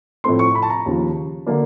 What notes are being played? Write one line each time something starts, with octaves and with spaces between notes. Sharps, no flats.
A2 F3 A3 C4 C6
C#6
B5
A5
A#5
D#2 C#3 F3
D3 F#3 A#3 D4